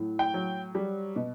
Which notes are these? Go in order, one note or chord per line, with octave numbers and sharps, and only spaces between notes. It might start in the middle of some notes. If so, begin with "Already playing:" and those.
Already playing: A2 F#3
G5
F#3
G3
B2